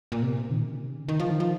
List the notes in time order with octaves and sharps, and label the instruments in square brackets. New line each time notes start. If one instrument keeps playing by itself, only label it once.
[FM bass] A#2
C3
A#2
D#3
C#3
C3
C#3
D#3
F3
D#3
F3